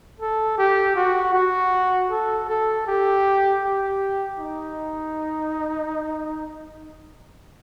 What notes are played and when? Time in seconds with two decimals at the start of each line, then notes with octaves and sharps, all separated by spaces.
0.20 A4
0.58 G4
0.96 F#4
1.34 F#4
2.11 A4
2.49 A4
2.87 G4
3.64 G4
4.40 D#4